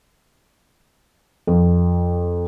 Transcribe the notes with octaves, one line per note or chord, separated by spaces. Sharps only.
F2